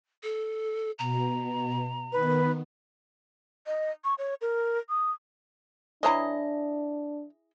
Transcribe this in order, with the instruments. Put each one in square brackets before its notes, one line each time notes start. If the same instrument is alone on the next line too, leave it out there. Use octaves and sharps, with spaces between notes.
[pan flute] A4
[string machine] B2 [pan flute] A#5
[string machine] D#3 B3 [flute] B4
[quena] D#5
C#6
C#5
A#4
D#6
[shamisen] E3 C#5 A#5 [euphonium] D4 [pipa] E4 G#4 D#5